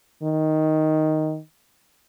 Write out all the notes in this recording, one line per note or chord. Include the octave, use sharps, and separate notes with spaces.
D#3